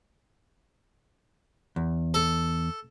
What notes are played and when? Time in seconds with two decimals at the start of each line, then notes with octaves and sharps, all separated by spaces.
1.76 E2
2.14 A4